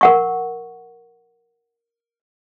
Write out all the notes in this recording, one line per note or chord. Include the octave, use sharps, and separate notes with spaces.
A#4 F#5 C#6